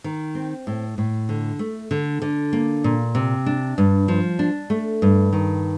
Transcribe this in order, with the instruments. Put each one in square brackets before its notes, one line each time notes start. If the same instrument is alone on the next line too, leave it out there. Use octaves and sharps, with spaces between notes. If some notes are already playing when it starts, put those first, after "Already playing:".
[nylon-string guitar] D#3
C4
A2
A2
D3
A3
D3
D3
A#3
A#2
C3
D4
G2
F3
D4
A3
G2
D#3